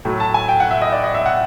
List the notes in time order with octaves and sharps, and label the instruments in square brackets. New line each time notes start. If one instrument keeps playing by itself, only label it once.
[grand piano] A2 F#3 A3
A5
G#5
G5
F#5
E5
D#5
D5
D#5
E5
F#5